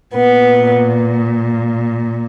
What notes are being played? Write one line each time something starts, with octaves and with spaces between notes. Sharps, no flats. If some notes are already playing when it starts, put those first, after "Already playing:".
A#2 B3